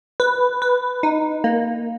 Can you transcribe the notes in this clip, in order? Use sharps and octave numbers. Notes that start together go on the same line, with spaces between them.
B4
B4
D#4
A#3